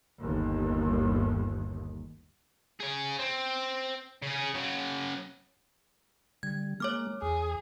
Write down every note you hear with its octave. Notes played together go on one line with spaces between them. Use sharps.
G1 D#2
G#4 C#5
C4
C#3 G#4
C#3 F#3
D3 G3 G#6
G#3 A#3 C#5 D6 F6
E2 G#4